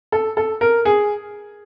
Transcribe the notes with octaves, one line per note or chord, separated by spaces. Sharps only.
A4
A4
A#4
G#4